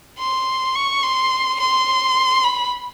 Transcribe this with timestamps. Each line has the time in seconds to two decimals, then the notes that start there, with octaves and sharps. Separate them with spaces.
0.19 C6
0.75 C#6
1.03 C6
1.60 C6
2.44 B5